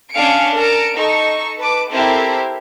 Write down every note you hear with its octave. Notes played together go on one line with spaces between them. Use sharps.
C#4 D4 F5 G#5 C#7 D7
A#4 A5 C#7 D7
D#4 A4 C#6
B4 A5 D6
C4 E4 G4 A4 A#4 C5